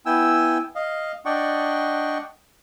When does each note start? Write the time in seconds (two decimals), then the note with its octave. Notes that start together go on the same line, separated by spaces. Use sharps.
0.06 B3 E4 G5 G#5 E6
0.75 D#5 F5
1.25 D4 D5 D#5 F#5 G5 C#6